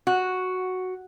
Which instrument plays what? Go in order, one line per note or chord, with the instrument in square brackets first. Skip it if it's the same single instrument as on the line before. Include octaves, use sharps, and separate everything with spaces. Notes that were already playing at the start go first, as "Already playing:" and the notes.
[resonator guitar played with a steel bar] F#4